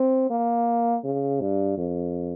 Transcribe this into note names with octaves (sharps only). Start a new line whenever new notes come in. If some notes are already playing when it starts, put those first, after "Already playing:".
Already playing: C4
A#3
C#3
G2
F2